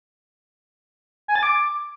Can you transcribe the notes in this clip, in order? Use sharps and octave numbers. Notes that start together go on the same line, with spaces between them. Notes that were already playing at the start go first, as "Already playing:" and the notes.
G#5
A6
D6